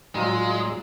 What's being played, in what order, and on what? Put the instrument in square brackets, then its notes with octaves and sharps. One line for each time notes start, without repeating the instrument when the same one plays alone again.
[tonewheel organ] A2 D5 E6 [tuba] F#3 [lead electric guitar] G#3 [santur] D#4 F4